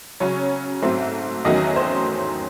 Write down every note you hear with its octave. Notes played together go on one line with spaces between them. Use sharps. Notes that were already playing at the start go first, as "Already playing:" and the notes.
C#3 F#3 C#4 C#5
G#2 F#3 A3 C4
E2 D#3 F#3 A3 C#4 D#5
C5